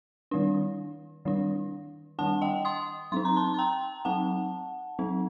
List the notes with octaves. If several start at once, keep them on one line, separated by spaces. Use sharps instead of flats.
D#3 G3 D4
D#3 G3 D4
D#3 G3 D4 F#5 A5
D#5 G5
C6 D#6
F#3 C4 D#4 C6
A#5
A5 C6
C6
G5 A#5
F#3 C4 D#4 F#5 A5
F#3 C4 D#4